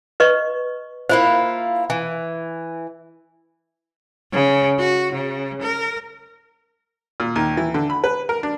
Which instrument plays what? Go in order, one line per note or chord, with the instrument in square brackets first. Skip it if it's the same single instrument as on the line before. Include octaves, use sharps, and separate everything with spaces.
[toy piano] B4 D#5 C#6
[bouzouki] A#3 E4 F4 [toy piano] C5
[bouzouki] E3 [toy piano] G#5
[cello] C#3
F#4
C#3
A#4
[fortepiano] A#2
D#2
E3
D3
B5
B4
A#4
D4